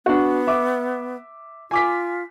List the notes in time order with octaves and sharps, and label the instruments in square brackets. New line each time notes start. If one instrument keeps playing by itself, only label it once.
[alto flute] B3 [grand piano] D4 F#4
[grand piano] E5 D6
[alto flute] F4 [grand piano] G#5 D6 B6